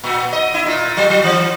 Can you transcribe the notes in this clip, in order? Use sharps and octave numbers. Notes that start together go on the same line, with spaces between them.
A#2
D#5
E4
A#2
F#3
F#3
E3